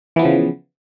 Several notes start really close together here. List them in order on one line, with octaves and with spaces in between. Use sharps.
E3 B3 F3 C#3